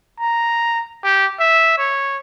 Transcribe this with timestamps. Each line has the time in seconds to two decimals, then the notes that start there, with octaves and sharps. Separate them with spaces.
0.20 A#5
1.04 G4
1.40 E5
1.78 C#5